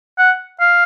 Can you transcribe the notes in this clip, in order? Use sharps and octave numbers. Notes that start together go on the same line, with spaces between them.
F#5
F5